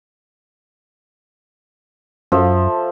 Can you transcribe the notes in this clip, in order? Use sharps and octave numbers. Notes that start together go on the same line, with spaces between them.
F#2 F3 A4 E5